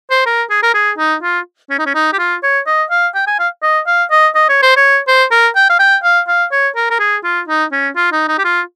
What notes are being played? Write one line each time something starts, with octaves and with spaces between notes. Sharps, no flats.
C5
A#4
G#4
A#4
G#4
D#4
F4
C#4
D#4
C#4
D#4
G4
F4
C#5
D#5
F5
G5
G#5
F5
D#5
F5
D#5
D#5
C#5
C5
C#5
C5
A#4
G5
F5
G5
F5
F5
C#5
A#4
A#4
G#4
F4
D#4
C#4
F4
D#4
D#4
G4
F4